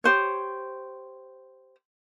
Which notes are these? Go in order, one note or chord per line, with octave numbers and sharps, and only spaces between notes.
G4 C5 C#5